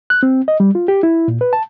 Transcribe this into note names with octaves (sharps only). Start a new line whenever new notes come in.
F#6
C4
D#5
G3
F4
G4
E4
A#2
B4
A5